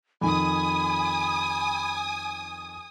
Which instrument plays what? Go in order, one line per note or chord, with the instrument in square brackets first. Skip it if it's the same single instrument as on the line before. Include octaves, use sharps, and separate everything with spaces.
[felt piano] F2 D#3 [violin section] G#5 D#6 [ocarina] B5